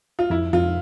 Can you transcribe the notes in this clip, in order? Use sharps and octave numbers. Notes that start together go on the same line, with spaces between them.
F4
F2 E4
F2 F4